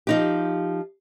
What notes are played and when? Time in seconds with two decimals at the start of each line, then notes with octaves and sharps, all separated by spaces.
0.07 F3 D#4 G4